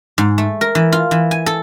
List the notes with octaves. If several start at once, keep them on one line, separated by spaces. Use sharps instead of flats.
G#2
A3
A#4
E3
F4
E3
G#5
A4